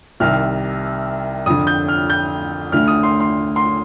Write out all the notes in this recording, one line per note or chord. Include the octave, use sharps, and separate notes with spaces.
C2 C3 D#3 F6
F2 D3 D#6
G6
F6
G6
D2 D3 F6
D#6
C6
C6
C6